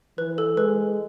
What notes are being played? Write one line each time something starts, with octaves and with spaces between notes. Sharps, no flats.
E3 B4
A4
G#3 B4